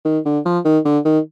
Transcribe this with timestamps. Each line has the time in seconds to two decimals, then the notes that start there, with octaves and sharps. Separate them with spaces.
0.05 D#3
0.25 D3
0.45 F3
0.65 D#3
0.85 D3
1.05 D#3